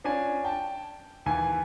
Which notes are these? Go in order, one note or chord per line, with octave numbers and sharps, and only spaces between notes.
C#4 D4 F4 G#5
G5 A5
D#2 E3 G#5